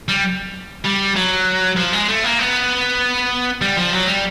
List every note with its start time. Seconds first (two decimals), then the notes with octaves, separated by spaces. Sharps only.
0.09 G3
0.85 G3
1.16 F#3
1.77 F3
1.93 G#3
2.08 A3
2.24 A#3
2.39 B3
3.61 G3
3.76 F3
3.93 F#3
4.07 G3